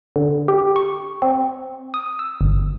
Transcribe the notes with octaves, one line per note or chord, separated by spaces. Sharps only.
D3
G4
C#6
C4
D#6
E6
G1